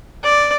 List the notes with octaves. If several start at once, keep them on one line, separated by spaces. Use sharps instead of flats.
D5